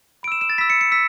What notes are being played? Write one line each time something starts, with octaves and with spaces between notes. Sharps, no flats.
B5 E6 D7 E7
E7
A6
B5 E6 B6
C#7
C#7
E6 B6